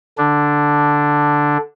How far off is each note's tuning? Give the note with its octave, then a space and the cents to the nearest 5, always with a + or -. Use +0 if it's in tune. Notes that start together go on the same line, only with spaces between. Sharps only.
D3 +0 D4 +0